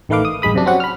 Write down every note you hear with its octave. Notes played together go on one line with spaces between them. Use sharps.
A1 D#3 A3 B4 F5 D6
D#6
A1 G2 G#3 B5 D#6
F#2 C3 D4
C4 C#4 F#4 F#5
B5 F6